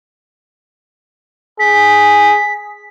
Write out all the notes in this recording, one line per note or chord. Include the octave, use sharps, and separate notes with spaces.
G#4 B6